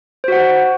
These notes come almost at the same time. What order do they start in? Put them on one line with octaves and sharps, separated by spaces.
C5 F#4 F#5